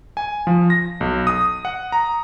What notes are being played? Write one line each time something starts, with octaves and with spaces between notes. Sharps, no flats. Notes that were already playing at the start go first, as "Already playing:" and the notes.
G#5
F3
A#6
B1
D#6
F#5
A#5